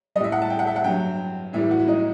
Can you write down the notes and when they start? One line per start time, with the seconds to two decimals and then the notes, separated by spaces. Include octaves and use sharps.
0.16 G3 D#5
0.20 A2 E5
0.32 F#5
0.42 A5
0.50 G5
0.59 F#5
0.67 E5
0.76 F#5
0.84 G2 F#3 G5
1.53 A2 E3 G3 E5
1.71 F#4
1.80 E4
1.88 D#4